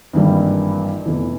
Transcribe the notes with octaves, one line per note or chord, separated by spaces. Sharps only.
G#1 G2 E3 G3 A#3
F1 E2 E3